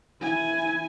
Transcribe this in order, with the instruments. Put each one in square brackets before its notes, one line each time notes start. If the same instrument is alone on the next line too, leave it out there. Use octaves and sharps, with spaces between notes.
[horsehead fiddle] E4 G#5